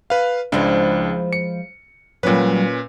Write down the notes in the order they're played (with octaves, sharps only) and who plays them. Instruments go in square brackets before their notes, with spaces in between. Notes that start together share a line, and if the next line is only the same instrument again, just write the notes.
[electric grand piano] B4 F5
[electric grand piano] C#2 D4 [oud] F3 G#3 E4
[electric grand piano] C#7
[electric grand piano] A#2 C#4 B4 [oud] F#3 G3